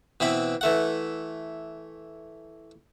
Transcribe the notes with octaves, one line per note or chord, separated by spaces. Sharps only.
B2 E3 C4 B5
E3 A3 F#5